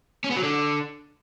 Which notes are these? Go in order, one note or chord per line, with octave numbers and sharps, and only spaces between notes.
C#4
B3
F#3
D3